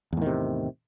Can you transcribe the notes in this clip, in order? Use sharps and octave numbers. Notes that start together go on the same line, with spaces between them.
E2 A2 C3 D#3